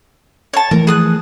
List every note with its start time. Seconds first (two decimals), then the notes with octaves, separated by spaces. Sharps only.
0.54 C#5 A5
0.71 E3 F3 A3 A#4
0.87 G#4 D#6 F#6